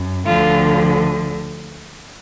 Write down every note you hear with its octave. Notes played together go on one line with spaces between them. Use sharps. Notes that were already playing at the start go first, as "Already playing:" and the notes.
Already playing: F#2
D2 D3 F3 F4